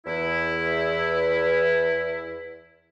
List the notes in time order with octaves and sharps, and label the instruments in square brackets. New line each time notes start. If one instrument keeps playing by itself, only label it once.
[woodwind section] E2 E4